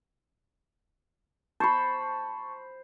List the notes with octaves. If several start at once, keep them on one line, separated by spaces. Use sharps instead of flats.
C5 A5 B5 C#6